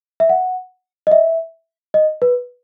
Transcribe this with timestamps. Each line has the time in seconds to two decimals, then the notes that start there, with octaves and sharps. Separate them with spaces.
0.20 E5
0.29 F#5
1.07 D#5
1.11 E5
1.94 D#5
2.22 B4